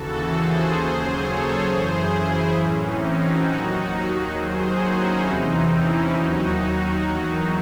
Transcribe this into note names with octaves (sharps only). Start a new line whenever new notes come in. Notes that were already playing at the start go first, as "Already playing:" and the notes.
Already playing: D#2 C#3 E3 F#4 A4
G#4 C5
D#2 C#3 F#3 G#4 C5
A4 C#5
F#2 C#3 E3 G#4 C5
E4 G#4
A2 E3 C#4
C4 D#4
D#4 F#4
D#2 D#3 F#3
D#2 D#3 F#3 G#4 C5
D#4 F#4
C#4 E4
E2 C3 E3 C4 D#4
C#4 E4
D#2 D#3 F#3 D#4 F#4
E2 D#3 F#3